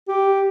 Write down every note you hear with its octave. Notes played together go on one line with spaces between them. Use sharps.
G4